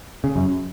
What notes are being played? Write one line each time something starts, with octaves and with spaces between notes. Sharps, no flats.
C#3
F#2